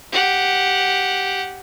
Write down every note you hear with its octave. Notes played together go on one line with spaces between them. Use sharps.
G4 F#5